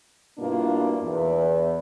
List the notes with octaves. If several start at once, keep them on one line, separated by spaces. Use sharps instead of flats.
G2 B2 A#3 D4 E4 F4
E2